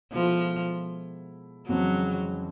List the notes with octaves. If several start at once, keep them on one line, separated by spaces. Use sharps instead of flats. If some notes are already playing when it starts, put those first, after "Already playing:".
B2 F3 G#3 B3 E4 A4
F2 C#3 E3 F#3 G#3 C4